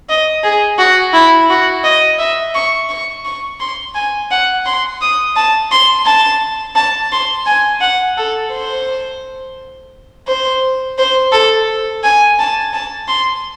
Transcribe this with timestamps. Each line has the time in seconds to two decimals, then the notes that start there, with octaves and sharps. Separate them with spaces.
0.09 D#5
0.43 G#4
0.78 F#4
1.13 E4
1.50 F#4
1.84 D#5
2.19 E5
2.55 C#6
2.89 C#6
3.25 C#6
3.60 C6
3.95 G#5
4.31 F#5
4.66 C6
5.01 D#6
5.36 A5
5.71 C6
6.06 A5
6.76 A5
7.12 C6
7.46 G#5
7.81 F#5
8.17 A4
8.52 C5
10.28 C5
10.98 C5
11.32 A4
12.03 G#5
12.39 A5
12.73 A5
13.08 C6